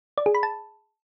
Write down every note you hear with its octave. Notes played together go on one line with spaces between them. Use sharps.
D5
G#4
B5
A5